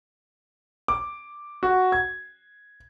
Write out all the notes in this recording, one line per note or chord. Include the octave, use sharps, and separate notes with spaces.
D6
F#4
G#6